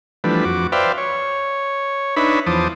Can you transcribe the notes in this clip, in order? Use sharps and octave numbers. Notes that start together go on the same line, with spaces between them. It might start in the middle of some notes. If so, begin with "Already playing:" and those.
E3 F3 G3 A3 D4 B4
F2 F#4 D6
B4 C5 D5 E5 F5 G5
C#5
D4 D#4 B4 C#5 E5 B5
E2 F3 C5 A5 D6 D#6